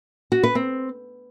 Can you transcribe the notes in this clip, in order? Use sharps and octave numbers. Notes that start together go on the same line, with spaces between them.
F#4
B4
C4